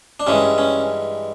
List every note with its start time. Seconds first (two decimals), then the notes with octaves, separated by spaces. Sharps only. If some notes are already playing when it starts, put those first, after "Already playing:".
0.20 D4
0.27 G2 E3 G#3 C#4
0.58 C#4